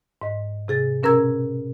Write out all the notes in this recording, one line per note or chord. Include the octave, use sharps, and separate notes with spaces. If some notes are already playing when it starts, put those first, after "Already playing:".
G#2 D#5
C3 G#4 A6
B2 C#4 A#4 A#5 E6 G#6